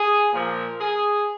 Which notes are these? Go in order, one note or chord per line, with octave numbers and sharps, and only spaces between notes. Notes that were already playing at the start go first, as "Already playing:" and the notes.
Already playing: G#4
A#2 F3 A#4
G#4